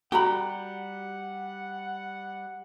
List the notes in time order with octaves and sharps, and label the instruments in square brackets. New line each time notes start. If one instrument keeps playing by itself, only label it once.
[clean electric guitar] G3 G4 [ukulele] F#4 A#5 B5 [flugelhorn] F#5